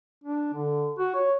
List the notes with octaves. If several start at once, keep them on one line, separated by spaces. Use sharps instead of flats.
D4
D3
F#4
C#5